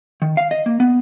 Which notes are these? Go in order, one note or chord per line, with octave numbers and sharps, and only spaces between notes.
D#3
F5
D#5
A#3
B3